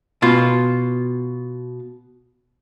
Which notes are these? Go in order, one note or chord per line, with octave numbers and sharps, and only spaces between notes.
B2 F4